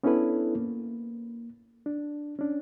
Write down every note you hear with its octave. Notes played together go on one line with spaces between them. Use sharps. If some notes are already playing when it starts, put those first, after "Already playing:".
B3 C#4 D4 E4 A4 B4
A#3
D4
C#4 D4